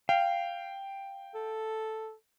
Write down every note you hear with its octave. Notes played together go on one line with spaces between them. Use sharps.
F5 G5
A4